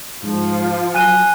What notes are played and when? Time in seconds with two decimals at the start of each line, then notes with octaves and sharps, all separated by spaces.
0.24 G#2 F3 F4
0.94 F#3 G#5 F#6 D#7